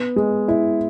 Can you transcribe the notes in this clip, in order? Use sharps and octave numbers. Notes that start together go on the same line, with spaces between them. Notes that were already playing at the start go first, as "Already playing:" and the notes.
Already playing: B3
G#3
E4